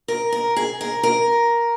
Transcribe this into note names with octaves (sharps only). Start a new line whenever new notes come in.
A#4
A#4
G#4
A#4
A#4